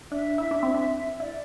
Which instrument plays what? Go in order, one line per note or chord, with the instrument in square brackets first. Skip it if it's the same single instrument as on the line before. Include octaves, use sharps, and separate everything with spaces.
[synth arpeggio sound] D4 [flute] E5
[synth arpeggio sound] E4
D4
C4
D4
[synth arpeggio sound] E4 [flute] D5